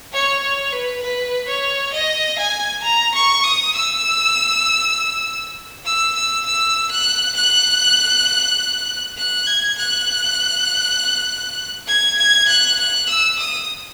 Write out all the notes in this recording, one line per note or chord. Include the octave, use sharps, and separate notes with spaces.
C#5
C#5
B4
B4
C#5
D#5
G#5
A#5
C#6
D#6
E6
E6
E6
E6
F#6
F#6
F#6
G#6
F#6
G#6
G#6
F#6
F#6
E6
D#6